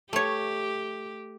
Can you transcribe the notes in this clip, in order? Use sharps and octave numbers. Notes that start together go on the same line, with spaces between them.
A3 G4 C#5